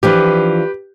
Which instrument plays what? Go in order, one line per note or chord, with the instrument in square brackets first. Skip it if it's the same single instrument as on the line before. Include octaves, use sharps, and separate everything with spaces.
[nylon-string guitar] E3 F3 D4 [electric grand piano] G4 B4